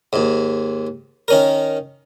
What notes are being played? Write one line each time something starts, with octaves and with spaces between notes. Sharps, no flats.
D#2 G#2
D#3 C#4 A#4